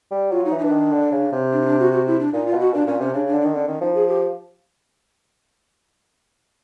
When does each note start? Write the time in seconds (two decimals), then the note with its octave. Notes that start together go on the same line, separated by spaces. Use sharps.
0.11 G3
0.31 F#3 F4
0.45 D#4
0.52 E3
0.59 D#4
0.62 E3 D4
0.72 D#3
0.92 D3
1.12 C#3
1.32 C3
1.52 D4
1.62 D#4
1.66 D4
1.80 F#4
1.92 F#4
2.07 E4
2.20 D4
2.33 A#2 D#4
2.46 F4
2.53 B2
2.60 F#4
2.73 A#2 D4
2.87 A#2 C#4
3.00 C3 C#4
3.14 C#3 D4
3.27 D4
3.34 D3
3.41 D4
3.45 D#3
3.54 D3 C#4
3.68 D#3 C#4
3.81 F3 D#4
3.95 G#4
4.08 G4